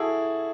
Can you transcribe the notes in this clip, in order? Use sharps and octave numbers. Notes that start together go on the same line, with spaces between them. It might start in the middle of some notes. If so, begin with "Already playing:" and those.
Already playing: E4 F#4 G#4 A4